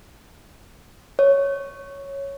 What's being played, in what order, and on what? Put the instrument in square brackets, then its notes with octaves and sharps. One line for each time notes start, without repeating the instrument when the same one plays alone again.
[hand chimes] C#5